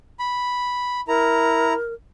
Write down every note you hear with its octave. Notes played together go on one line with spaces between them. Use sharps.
B5
E4 A#4 A#5